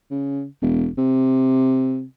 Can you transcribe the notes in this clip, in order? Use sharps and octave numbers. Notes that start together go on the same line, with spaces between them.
C#3
E1
C3